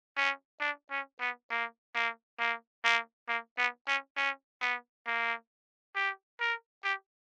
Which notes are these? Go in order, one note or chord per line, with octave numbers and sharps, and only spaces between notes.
C#4
D4
C#4
B3
A#3
A#3
A#3
A#3
A#3
B3
C#4
C#4
B3
A#3
G4
A#4
G4